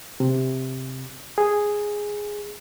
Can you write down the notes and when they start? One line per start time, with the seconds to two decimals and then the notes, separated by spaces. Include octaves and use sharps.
0.20 C3
1.38 G#4